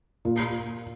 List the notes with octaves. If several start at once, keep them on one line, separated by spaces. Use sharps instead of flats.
A#2